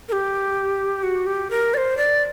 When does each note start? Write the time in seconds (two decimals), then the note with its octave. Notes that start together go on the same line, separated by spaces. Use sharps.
0.09 A#4
0.12 G4
1.03 F#4
1.26 G4
1.51 A#4
1.74 D5
1.77 C5
1.97 D5